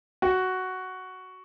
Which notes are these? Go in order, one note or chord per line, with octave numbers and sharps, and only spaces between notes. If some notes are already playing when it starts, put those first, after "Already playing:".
F#4